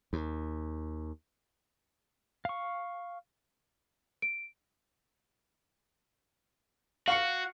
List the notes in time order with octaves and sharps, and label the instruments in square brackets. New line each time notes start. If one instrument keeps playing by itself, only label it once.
[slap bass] D#2
[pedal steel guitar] F5 C#6
[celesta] D7
[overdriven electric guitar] F#4 [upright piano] F5 C#6 C#7